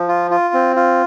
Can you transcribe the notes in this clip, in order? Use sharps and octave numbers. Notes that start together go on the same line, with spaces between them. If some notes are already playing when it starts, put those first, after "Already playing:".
Already playing: F3
F4
F4
C4
F4